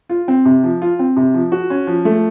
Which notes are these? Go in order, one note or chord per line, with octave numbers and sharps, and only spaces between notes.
F4
C4
C3
F3
F4
C4
C3
F3
F#4
C#4
F3
A3